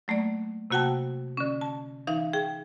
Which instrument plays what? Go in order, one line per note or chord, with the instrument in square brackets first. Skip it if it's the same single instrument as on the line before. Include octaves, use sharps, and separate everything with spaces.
[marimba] F#3 A3 A#3 D5
C3 A#3 F#4 F#5 G5 A5
D3 C#4
A5
E3 D#4 F5
G#4 G5